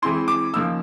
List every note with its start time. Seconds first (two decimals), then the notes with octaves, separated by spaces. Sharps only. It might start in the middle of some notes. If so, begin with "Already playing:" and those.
0.02 E3 G#3 C4 E4 C6
0.28 D6
0.54 C#3 F3 A#3 D#4 E6